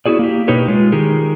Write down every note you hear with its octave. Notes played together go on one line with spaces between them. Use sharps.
B3 E4 F#4 G#4 D5
A#3 G4
B2 D#4 G4 A#4 B4 C#5
G#3 F4
D#3 D#4 G4 G#4 A#4